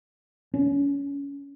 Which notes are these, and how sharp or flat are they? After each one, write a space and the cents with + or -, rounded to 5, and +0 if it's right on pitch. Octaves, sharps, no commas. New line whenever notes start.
C#4 +25